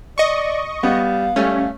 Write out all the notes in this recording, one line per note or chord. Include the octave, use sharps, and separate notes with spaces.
D5 D#5 C#6
G3 B3 F5
G3 A3 C#4